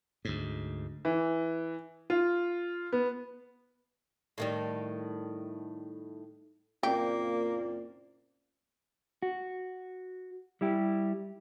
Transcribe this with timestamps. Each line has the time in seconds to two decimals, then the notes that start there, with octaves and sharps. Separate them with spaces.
0.25 D2 G#2
1.05 E3
2.10 F4
2.92 B3
4.38 A2 D#3 G3
6.83 F#1 A#2 A#3 C4 G4 D5
9.22 F#4
10.61 G3 E4 G4